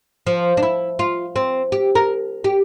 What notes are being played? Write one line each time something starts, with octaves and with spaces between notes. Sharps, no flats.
F3
D4
E4
F4
C4
G4
A#4
G4